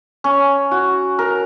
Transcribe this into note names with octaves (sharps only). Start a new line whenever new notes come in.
C#4
F#4
A#4